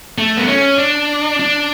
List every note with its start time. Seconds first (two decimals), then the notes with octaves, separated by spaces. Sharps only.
0.18 A3
0.37 B3
0.48 C#4
0.78 D4
1.39 D4